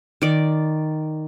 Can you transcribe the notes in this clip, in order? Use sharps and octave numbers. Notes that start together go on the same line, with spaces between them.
D#3 D5